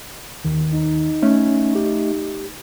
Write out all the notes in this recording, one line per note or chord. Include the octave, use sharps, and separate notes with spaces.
D#2 D#3
D#4
A3 C#4
G4